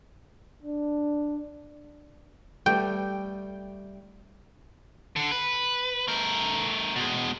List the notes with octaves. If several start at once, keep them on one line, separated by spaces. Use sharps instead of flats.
D4
G3 A3 G5
D3
B4
A3 A#4
B2 G#3